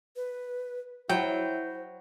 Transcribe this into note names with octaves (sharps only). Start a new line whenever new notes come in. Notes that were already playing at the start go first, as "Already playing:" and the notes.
B4
F#3 E4 C5 G5